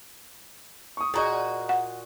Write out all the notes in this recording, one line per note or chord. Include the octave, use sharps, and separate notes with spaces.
C#6 D#6
A#2 F#4 G#4 D#5 A#5 C#6
F#5